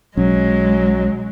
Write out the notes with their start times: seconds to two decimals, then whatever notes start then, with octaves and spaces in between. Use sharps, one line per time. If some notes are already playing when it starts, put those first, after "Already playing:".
0.17 B1 F#3 G#3 C#4